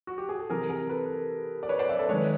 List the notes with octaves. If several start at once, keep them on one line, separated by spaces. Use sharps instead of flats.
F#4
G4
G#4
A4
C3 E3 G3 G#4 A#4
G#4 A#4
A4 B4
D5
B4 C#5
C5 D5
D5 E5
A4 B4
D#3 G#3 B4 C#5